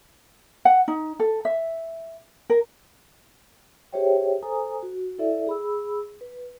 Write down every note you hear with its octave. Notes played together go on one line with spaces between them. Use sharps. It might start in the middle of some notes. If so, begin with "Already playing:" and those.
F#5
D#4
A4
E5
A#4
G4 G#4 C5 C#5 E5 G5
A4 C5 G#5 A#5 D#6
F#4
E4 A4 D5 E5
G#4 B5 E6
B4